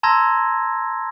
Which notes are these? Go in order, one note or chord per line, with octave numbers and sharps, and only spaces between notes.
A5 A#5 C6 E6 G#6 A#6